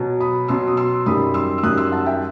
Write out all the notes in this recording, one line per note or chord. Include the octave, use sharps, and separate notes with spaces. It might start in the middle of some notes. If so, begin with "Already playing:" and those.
Already playing: B2 F#3
B5 D#6
B2 F#3 C6 E6
D#6
C6 E6
F#2 D#3 G3 B5 D#6
C6 E6
E6
F#2 D#3 G3 D#6 F#6
C6 E6
F#5 A5
E5 G5